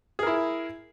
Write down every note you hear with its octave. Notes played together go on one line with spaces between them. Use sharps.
E4 G#4 A#4